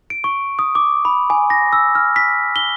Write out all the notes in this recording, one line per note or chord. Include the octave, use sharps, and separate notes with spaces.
D7
C#6
D#6
D6
B5
G#5
A#6
E6
F6
B6
G7